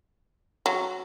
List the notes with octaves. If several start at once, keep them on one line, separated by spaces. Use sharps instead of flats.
F#3